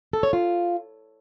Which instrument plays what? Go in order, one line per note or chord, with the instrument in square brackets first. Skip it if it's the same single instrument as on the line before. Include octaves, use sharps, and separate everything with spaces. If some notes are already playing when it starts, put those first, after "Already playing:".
[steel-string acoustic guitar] A4
C#5
F4